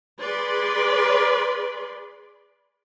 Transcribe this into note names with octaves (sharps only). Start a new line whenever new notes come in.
G#4 B4 D5 B5 C6